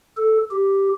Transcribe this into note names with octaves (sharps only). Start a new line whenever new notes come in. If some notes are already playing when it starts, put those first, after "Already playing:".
A4
G4